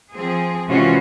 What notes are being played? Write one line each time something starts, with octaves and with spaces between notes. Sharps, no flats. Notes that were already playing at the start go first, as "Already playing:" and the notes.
F3 C4 G#4
C3 E3 G#3 C#4 F4 F#4